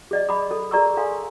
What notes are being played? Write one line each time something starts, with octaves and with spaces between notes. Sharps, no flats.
G#4 D5 D#5
B5 D6
A4
G#4 A#4 D5 A#5 C#6 E6
A4 F5 G#5 C6